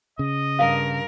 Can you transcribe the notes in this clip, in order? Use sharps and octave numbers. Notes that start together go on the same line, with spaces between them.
C#3 D#5
G2 A#4 F5